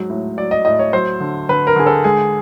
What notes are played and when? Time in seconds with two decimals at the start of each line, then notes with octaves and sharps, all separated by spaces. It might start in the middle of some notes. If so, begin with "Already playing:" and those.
Already playing: G#2 F#3
0.10 A2
0.38 F#3 D5
0.51 D#5
0.65 A2 D#5
0.79 C#5
0.93 F#3 C5
1.20 D3
1.49 D3 B4
1.67 A#4
1.76 D3 G#4
1.86 A4
2.04 G#3 G#4